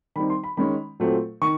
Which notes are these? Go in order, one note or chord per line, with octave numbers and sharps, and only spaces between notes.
D#3 G3 C4 D#4 B5
C6
B5
D#3 G#3 C#4 B5
A#2 F#3 A3 C4
D#3 C#6